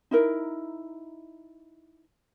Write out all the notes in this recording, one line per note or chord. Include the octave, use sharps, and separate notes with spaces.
D#4 E4 A#4